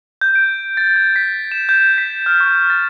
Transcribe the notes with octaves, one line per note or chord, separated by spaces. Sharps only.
G6
D7
A6
G#6
B6
E7
G6
B6
F6
C#6
A6